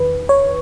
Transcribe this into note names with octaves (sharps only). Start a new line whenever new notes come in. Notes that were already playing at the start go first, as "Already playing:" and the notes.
Already playing: E2 D#3 B4
C#5